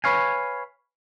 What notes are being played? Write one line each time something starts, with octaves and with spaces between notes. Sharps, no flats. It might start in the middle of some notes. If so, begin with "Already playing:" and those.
B4 C#5 F5 G#5